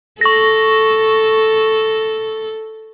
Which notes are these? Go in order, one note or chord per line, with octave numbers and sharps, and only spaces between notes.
A4 C#6 A#6